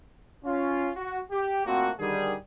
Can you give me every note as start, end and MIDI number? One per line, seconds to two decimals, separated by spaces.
0.45 0.90 61
0.45 0.90 65
0.95 1.19 66
1.31 1.63 67
1.66 1.90 46
1.66 1.90 57
1.66 1.90 58
1.66 1.90 60
1.66 1.90 66
1.99 2.34 50
1.99 2.34 51
1.99 2.34 55
1.99 2.34 68